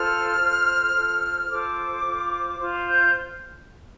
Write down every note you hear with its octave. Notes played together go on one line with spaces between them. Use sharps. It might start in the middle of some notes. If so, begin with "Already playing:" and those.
Already playing: F4 A4 C5 F6
F4 A4 C5
F4 A4 C5
F4 A4 C5 D6
F4 C5
F4 C5
G6